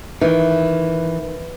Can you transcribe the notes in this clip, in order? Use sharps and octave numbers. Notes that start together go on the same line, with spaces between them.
D#3 E3